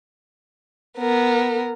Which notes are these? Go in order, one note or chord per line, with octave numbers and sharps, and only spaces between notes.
B3 A#4